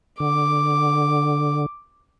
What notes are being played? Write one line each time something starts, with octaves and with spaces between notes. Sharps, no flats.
D3 D6